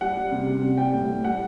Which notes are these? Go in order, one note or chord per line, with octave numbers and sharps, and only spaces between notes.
G3 F#5
G3
C3
C3
G3
G3 G5
A2
A2
G3 F#5